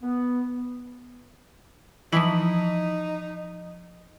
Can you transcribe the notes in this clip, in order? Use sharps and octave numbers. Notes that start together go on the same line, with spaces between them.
B3
E3 F3 D#4 B6 F#7